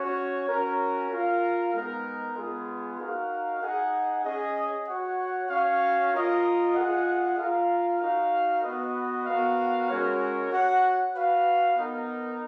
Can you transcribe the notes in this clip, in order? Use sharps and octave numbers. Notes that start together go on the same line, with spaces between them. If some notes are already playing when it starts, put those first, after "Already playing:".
Already playing: C#4 F#4 C#5
C#4 F#4 A#4
F4 A#4 F5
G#3 B3 D#4 A#4
G#3 B3 F4 G#4
D#4 F#4 A#4 F5
D#4 G#4 D#5 F#5
C#4 G#4 D#5
F#4 C#5 F#5
C#4 F#4 C#5 F5
F4 A#4 D#5
F4 G#4 D#5 F#5
F4 A#4 F5
D#4 F#4 A#4 F5
B3 F#4 B4 D#5
B3 F#4 A#4 F5
G#3 C#4 F#4 A#4 C#5
F#4 C#5 F#5
F#4 B4 F5
B3 D#4 A#4